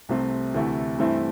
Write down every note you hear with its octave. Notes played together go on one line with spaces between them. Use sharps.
C2 C3 A3 C4
D2 C3 E3 A3 E4
G2 E3 A3 C4 E4